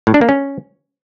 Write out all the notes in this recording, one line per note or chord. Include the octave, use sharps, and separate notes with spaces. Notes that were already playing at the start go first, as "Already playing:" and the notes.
A2
D4
A#3
C#4